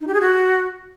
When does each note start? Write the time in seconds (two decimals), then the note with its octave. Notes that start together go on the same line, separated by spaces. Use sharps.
0.01 D#4
0.07 G4
0.14 G#4
0.21 F#4